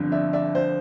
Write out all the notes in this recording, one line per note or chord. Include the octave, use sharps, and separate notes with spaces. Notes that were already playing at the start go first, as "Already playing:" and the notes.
Already playing: G1 F2 D3
D5 E5
D5 E5
C5 D5